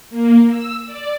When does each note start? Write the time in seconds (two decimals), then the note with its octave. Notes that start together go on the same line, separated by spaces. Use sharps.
0.10 A#3
0.48 E6
0.86 D5